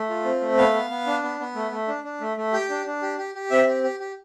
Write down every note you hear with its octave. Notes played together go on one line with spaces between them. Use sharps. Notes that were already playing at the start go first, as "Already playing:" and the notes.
Already playing: A3
F4
C4
A3
B3 F5
B3
B3
D4
B3
B3
A3
A3
D4
D4
A3
A3
G4 G5
D4
D4
G4
G4
G4
C4 E5
G4
G4
G4